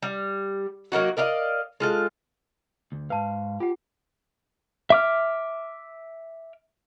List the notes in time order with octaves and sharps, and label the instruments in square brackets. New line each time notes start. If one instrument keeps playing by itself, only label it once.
[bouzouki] G3
F#3 A#3 D#4 F#4
A#4 D5 D#5 F5
G#3 F4 A4
[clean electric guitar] D2
[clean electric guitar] G#2 F5 [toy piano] B4 A5
[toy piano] F4 F#5 [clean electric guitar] G4
[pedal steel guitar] E5 D6 F6